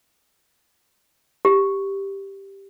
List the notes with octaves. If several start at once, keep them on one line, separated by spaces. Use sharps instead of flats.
G4